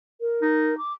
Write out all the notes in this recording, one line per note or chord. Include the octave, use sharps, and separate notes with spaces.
A#4
D#4
D6